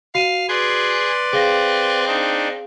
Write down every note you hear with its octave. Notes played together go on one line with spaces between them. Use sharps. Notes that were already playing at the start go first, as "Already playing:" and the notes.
F#4 F5 D#7
G#4 B4 D5 C6
C4 G#4 F5 A#6
D4 D#4